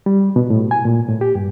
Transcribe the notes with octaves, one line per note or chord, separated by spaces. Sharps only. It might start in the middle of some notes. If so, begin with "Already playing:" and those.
G3
B2
A2
G#5
A#2
A2
G4
G2